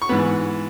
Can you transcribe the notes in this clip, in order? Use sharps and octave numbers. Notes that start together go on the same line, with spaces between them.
C#6
G#2 E3 B3 B5